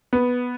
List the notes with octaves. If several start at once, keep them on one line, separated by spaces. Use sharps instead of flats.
B3